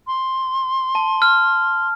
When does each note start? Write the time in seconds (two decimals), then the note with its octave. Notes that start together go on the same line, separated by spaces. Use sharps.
0.07 C6
0.95 A5
1.22 F6